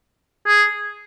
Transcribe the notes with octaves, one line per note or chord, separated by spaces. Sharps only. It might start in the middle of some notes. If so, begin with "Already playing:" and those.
G#4